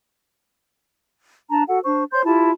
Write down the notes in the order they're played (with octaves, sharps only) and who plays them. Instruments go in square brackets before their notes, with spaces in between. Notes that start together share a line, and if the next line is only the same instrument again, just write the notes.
[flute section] D4 A5 A#5
F#4 A4 F#5
D4 C5 C#6
C5 C#5 C6 G6
E4 F4 G4 A5